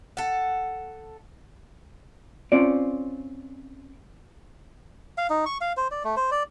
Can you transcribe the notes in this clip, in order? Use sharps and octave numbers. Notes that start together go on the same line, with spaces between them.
A4 F#5
C4 C#4 F4 D5
F5
D#4
C#6
F5
C5
D5
A3
C5
D5